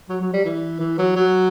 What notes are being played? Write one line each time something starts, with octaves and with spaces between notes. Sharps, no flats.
F#3
F#3
G3
E3
E3
F#3
F#3